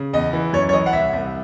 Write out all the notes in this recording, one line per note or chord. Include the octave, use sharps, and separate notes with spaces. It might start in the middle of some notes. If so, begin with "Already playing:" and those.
Already playing: C#3
E2 D#5
E3
F#2 C#5
C#5
E3 D#5
F#5
C2 E5
C2